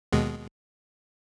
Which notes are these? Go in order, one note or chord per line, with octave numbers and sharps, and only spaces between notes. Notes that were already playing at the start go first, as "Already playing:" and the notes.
D#2 B2 G#3